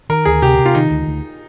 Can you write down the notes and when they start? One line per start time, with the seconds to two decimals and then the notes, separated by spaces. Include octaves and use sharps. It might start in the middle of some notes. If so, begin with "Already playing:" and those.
0.09 D#3 A#4
0.25 D2 G#4
0.42 C3 G4
0.59 C3
0.66 F4
0.75 D#3 D#4
0.91 D2
1.07 D2